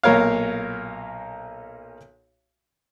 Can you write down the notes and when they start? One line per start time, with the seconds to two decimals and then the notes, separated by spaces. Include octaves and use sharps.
0.03 B1 A#2 A#4 C#5 F5